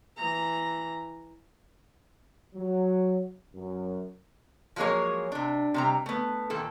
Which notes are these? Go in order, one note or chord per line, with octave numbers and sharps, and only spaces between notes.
E3 A#5
F#3
F#2
F3 F#3 G#3 A#3 G#4 C#5
C3 D4
C3 G3 A#5
A3 B3
A#2 D#3 A4